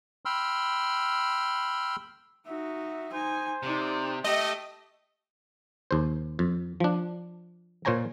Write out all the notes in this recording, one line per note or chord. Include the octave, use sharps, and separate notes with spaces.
G5 B5 C6 E6 F6
D#4 F#4 E5
D#4 C5 G#5
C3 D#4 D5
A3 G4 D#5 E5
D#2 C5
F2
F3 D4
A#2 C5 C#5 G#5 A#5